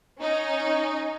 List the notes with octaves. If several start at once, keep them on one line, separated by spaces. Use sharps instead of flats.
C#4 D#4